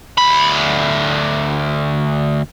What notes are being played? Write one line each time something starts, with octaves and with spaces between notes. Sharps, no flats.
D2 B5